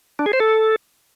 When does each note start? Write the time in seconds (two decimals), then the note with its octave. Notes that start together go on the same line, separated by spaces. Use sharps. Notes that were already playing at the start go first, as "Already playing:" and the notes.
0.19 D4
0.26 G#4
0.33 C5
0.40 A4